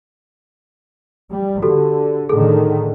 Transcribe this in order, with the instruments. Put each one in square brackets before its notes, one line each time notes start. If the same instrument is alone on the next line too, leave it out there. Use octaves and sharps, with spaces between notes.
[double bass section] G3
[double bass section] D3 [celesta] F#4 G4 A4
[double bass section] A2 D3 D#3 [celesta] G#4 A4